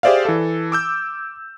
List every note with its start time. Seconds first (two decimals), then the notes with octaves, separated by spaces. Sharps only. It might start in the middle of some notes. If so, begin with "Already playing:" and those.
0.03 G4 G#4 C5 D5 E5 F5
0.25 E3 A4
0.72 D6 E6 G6